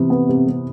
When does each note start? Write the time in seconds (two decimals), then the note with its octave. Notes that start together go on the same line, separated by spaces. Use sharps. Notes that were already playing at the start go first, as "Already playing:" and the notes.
Already playing: C3 E3 B3
0.10 B3
0.29 C3
0.48 C3